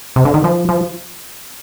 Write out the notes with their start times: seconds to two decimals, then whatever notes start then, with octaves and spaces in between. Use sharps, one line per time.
0.16 C3
0.25 D3
0.34 D#3
0.44 F3
0.69 F3